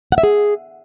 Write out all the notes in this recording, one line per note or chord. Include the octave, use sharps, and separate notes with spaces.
F#5
E5
G#4